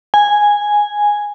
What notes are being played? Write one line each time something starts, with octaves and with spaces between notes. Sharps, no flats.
G#5